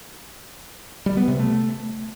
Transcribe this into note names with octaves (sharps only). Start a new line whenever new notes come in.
G3
B3
C3
A3